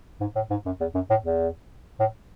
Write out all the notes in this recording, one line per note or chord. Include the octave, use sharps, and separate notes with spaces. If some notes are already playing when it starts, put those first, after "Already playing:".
G#2
A2
G#2
F#2
E2
F#2
A2
E2
A2